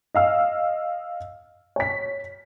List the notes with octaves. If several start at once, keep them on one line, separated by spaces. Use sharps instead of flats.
D#5 F5 E6
C#5 B6